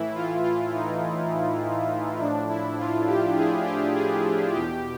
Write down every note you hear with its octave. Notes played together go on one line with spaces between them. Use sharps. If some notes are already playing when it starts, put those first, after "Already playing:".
Already playing: A2 E3 E4
F4
F4
D#4
A2 F3 D4
E4
F4
G4
G#4
G4
G#4
E2 B2 G4